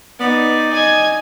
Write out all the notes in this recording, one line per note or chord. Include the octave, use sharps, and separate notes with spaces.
B3 D#4 D5
D#5 G#5 G#6